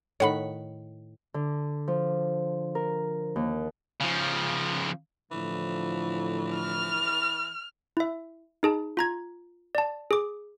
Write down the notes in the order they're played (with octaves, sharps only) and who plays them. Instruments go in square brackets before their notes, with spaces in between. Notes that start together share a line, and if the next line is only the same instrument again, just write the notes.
[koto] A2 D#3 [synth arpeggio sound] C#5 F#5 B5
[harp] D3
F3
A#4
D#2
[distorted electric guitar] C#3 F3
[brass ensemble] A2 D3 F3 [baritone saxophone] E3
[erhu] F6
[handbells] E4 E5
D#4 G#4 A5
F4 A#5 G#6
D5 A5
G#4 D6